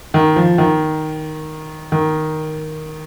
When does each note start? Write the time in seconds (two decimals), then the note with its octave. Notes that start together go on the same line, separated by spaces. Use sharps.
0.14 D#3
0.36 F3
0.58 D#3
1.92 D#3